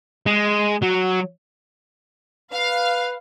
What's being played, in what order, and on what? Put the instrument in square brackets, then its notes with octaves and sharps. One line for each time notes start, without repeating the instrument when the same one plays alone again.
[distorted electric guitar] G#3
F#3
[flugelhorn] B4 [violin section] F5